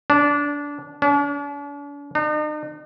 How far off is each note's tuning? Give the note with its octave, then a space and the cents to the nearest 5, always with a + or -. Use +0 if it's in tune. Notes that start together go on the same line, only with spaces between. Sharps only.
D4 -20
D4 -45
D#4 -45